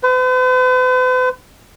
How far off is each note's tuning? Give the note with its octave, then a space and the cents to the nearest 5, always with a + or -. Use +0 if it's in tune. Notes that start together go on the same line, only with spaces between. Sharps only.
B4 +45